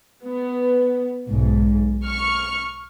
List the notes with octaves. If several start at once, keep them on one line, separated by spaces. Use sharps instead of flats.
B3
B1 G#2
C#6 F6